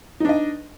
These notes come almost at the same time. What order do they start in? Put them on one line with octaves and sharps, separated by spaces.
D#4 D4 D#5